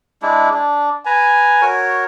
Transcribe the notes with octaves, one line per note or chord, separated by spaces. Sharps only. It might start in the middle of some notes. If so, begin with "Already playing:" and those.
G#3 D4 E4
D4
B4 G#5 A#5
F#4 A#4 C#5